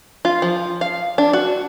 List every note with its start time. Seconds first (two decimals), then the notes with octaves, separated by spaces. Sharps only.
0.25 F4
0.42 F3
0.81 F5
1.18 D4
1.33 F#4